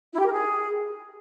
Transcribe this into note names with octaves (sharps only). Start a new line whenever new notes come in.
E4
G4
A#4
G#4